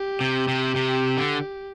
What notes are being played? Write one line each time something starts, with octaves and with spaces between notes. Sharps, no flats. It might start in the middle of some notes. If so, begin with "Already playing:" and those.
Already playing: G4
C3
C3
C3
D3